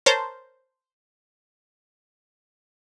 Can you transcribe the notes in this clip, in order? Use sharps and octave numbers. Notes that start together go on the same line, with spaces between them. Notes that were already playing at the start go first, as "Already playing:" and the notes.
A#4 C5 C#5 A5